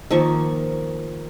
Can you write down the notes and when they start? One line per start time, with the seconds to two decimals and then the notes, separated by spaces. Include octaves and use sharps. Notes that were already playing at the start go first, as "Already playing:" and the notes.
0.11 D#3 F3 A#3 C#6